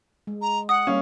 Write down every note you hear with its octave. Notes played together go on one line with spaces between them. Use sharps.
G#3
A#5
F#5 D#6
G3 A#3 C#4 F5